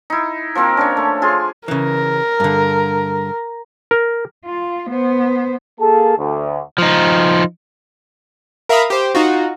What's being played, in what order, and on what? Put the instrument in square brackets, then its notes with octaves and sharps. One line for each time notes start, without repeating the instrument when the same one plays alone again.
[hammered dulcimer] D#4 E4
F3 A#3 C4 A#4
C#4 D4 C#5
A3
F4 G#4 C6
[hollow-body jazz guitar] C#3 E3 [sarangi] A#4
[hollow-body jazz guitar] G2 D3
[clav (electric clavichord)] A#4
[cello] F4
B3 C5
[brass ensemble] A#3 G#4 A4 A5
D2
[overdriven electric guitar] F3 D#4
[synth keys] A#4 E5 F5 A#5 B5 D#6
G4 C5
D#4 F4 F#4